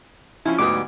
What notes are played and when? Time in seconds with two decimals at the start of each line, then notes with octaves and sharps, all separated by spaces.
0.45 F3 C#4 E4 F4 G#5
0.59 D2 G#2 F#3 G3 B3 D6 D#6